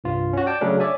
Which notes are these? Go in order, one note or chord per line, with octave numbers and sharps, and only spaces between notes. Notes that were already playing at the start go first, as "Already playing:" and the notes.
C2 G2 F4
C#4 F#4
D5 G5 A5
C#3 F#3 A3 C#4 D4
C#5 D5 E5 G#5